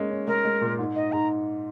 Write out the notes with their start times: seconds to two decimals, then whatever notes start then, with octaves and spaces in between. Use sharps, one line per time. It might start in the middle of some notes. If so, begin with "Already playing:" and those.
Already playing: G#3 A#3 C#4
0.10 C#4
0.28 G#3 A#4
0.45 G#3
0.61 A#2
0.78 G#2
0.95 D#4 D#5
1.12 G#2 A#5